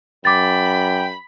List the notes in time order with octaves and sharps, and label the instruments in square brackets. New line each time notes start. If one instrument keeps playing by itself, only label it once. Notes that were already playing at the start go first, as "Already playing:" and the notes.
[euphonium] F#2 [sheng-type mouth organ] G5 [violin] B5 [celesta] D6 A6